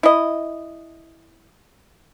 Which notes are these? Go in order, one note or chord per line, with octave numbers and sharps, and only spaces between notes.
E4 D#5